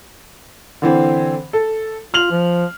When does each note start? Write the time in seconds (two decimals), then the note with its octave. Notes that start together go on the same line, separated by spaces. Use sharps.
0.82 D3 E3 C4
1.53 A4
2.14 F4 F6 F7 F#7
2.31 F3